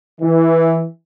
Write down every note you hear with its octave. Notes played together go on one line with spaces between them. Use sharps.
E3